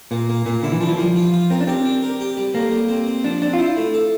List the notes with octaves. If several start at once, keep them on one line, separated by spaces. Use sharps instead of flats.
A#2 A#3
A#3
A#2 A#3
D3 E4
E3
F3 D4
E3
F3 G3
F4
F4
C4 A#4
D4
C4 G4
D4
A#4
G4
G3
A2 A#3
G3
C4
C4
F3 D4
C4 D4
F4
E4 C5
A3
A4